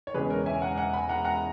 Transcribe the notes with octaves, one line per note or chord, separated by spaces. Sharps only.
C#5
E1 E2 C#3 G#3 G#4 B4
A#4 C#5
E5 G#5
F#5 A#5
F#5 A#5
G#5 B5
F#5 A#5
F#5 A#5